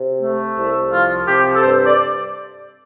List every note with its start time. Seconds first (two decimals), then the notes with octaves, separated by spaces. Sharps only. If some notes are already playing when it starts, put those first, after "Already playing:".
Already playing: C3
0.22 A3
0.57 C2
0.93 F3 F4
1.28 C3 G4
1.55 A4
1.63 G2 C5
1.86 D5